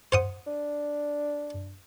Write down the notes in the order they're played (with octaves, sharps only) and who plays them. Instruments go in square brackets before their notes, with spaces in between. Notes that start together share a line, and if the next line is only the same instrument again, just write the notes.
[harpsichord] C5 F#5 D#6
[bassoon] D4